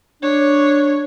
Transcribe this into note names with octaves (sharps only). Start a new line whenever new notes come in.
D4 C#5